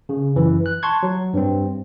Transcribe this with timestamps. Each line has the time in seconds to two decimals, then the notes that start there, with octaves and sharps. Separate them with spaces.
0.09 C#3
0.36 F#2 E3
0.66 F#6
0.83 A5 C6 C#6 G#6
1.03 F#3
1.34 G2 C4